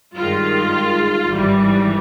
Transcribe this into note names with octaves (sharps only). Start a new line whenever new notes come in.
G2 D#3 G#3 F4
G#1 G2 E3 G3